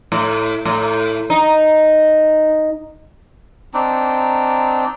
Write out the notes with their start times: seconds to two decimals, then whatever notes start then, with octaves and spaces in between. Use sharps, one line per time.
0.12 A2
0.65 A2
1.30 D#4
3.74 C4 D4 D#4